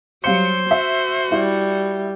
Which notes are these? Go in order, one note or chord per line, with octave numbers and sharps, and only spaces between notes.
F#3 G3 C5 F5 C#7
F#4 E5
G3 E4